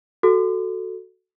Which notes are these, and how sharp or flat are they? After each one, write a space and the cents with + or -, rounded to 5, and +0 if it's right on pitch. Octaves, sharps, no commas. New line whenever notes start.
F#4 +0 A4 +0